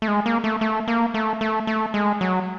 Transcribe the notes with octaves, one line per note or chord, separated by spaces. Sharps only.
A3
G#3
A#3
A3
A3
A#3
A3
A3
A3
G#3
F#3